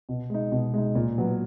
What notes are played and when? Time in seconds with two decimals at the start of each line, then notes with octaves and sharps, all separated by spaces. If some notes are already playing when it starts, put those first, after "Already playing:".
0.09 B2
0.30 G#3 D#4
0.52 B2
0.74 G#3 D#4
0.95 A#2
1.18 F#3 B3